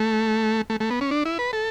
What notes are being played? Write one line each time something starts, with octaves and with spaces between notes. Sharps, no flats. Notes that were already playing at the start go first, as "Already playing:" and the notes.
Already playing: A3
A3
A3
B3
C#4
D4
E4
B4
A4